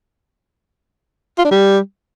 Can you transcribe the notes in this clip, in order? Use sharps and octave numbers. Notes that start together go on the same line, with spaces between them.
F4
D4
G3